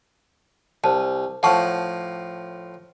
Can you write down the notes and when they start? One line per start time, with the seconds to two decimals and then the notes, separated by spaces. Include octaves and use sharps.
0.84 C2 C5 A5
1.43 A2 F3 F#5 A5 C#6